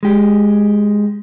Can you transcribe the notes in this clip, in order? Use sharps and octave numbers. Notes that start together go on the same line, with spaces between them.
G#3 G4